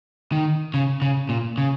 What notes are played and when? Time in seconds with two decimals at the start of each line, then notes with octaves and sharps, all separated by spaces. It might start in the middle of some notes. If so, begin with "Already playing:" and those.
0.32 D#3
0.74 C#3
1.02 C#3
1.29 A#2
1.58 C#3